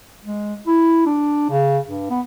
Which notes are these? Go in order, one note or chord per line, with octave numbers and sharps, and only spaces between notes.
G#3
E4
D4
C#3
G2
B3